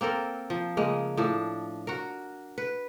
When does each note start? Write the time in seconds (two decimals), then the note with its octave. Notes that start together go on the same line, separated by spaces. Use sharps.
0.01 A#3 C4 A4 A#4
0.50 F3
0.77 C#3 G#3 A#3
1.17 A2 F3 D4
1.87 F#4 A#4
2.58 B4